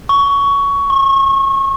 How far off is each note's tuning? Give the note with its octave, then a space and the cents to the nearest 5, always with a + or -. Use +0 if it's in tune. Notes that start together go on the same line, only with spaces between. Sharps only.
C#6 +15
C#6 -30